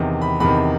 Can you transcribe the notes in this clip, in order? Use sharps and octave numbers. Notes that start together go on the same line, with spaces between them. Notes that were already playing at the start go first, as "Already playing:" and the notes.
Already playing: E2 C3 D#3
B5
E2 C3 D#3 B5